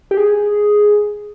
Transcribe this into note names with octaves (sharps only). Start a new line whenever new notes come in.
G4
G#4